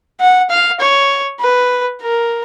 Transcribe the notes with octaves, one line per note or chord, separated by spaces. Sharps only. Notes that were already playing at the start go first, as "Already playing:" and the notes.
F#5
F5
C#5
B4
A#4